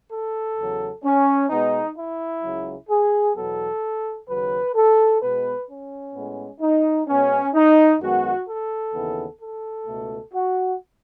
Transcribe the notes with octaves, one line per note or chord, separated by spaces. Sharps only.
A4
E2 C#3 F#3
C#4
B2 G#3 B3 D#4
E4
C#2 C#3 F#3
G#4
E2 B2 F#3 B3 A4
D#2 C#3 F#3 B4
A4
B2 G#3 B3 B4
C#4
A2 G#3 B3
D#4
B2 G#3 B3 C#4
D#4
F#2 D#3 G#3 B3 F#4
A4
D#2 C#3 E3 B3
A4
C#2 B2 A3
F#4